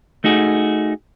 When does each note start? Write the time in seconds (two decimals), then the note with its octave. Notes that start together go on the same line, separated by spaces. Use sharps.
0.24 A3 D#4 F#4 G#4